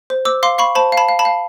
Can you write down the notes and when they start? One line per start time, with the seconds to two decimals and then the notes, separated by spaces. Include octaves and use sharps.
0.10 C5
0.25 C5 D6 E6
0.43 F5 C6 D6
0.58 F5 B5 C#6
0.75 C5 A5 B5
0.92 F5
0.97 A5 B5
1.09 F5
1.19 A5 B5
1.25 F5